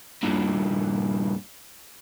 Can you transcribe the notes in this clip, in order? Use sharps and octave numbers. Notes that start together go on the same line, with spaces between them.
G2 A#2